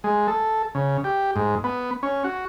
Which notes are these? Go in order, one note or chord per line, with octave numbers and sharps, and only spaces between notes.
G#3
A4
C#3
G4
G#2
B3
C#4
F#4